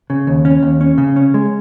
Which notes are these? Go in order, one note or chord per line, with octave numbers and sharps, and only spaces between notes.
C#3
D#2
C#4
D#2
C#4
C#3
C#4
G#3